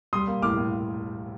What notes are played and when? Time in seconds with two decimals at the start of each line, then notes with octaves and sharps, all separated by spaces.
0.13 G3 C6 D#6
0.27 A#3
0.42 A2 D6 F6
0.57 A2